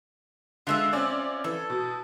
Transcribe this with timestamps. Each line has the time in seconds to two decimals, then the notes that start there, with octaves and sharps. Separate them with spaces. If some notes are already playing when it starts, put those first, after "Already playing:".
0.67 D3 G#3 F4 E5 F#5
0.93 C4 C#4 D5
1.44 E3 A4
1.70 B2